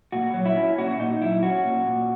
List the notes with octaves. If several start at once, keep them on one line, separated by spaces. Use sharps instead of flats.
A#2 F#4
F#3
E4
C#4
A#2 F#4
A#2 D#4
F#3 E4
C#4 F#4
A#2
A#2